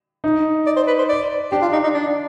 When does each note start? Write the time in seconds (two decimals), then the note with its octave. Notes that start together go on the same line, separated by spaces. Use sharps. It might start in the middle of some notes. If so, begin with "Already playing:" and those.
0.24 D#4
0.66 D5
0.77 C5
0.87 B4
0.99 C5
1.09 D5
1.52 D4 G4
1.62 F4
1.73 D#4
1.84 D#4
1.94 D4